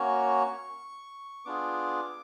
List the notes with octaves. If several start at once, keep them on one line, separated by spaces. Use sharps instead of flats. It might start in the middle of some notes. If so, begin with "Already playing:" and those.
Already playing: A#3 C#4 F#4 C#6
B3 D4 F4 G#4 D6